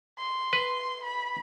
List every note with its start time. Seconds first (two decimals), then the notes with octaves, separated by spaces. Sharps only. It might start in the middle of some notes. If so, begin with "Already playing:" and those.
0.18 C6
0.53 B4
1.04 B5